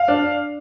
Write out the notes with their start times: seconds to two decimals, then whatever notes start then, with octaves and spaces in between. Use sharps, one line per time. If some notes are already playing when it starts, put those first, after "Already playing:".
Already playing: F5
0.08 D4